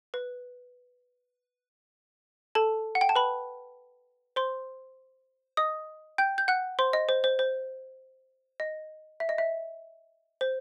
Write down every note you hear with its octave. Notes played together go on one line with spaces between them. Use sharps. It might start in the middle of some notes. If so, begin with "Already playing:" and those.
B4
A4 A5
F#5
G5
A5
B4 B5
C5 C6
D#5 D#6
G5 G6
G6
F#5 F#6
C5 C6
D#5
C5
C5
C5
D#5
E5
D#5
E5
C5